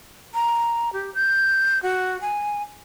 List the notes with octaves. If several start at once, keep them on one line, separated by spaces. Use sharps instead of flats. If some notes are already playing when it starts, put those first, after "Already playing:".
A#5
G4
G6
F#4
G#5